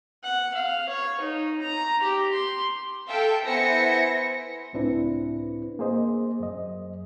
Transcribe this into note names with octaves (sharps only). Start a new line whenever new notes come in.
F#5
F5
C#5
D#4
A#5
G4
C6
A4 E5 F5 G5
B3 E4 C5 G#5 A#6 C#7
C#2 A2 C4 D4 E4 B4
A#3 G#4 C5 D#5
F#2 D#5